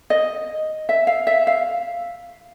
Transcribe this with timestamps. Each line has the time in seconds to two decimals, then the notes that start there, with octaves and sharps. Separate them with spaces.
0.10 D#5
0.89 E5
1.07 F5
1.27 E5
1.47 F5